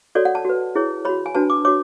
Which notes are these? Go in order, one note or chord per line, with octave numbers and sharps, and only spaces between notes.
F#4 A4 C#5 D5
F#5
A5
F#4 B4
E4 G#4 C#5
F#4 C#5 B5
G#5
D4 F#4 B4 A5
D6
F#4 C#5 D6